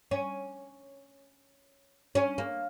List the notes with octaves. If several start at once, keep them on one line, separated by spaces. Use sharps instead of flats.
C#4
C#4
A#3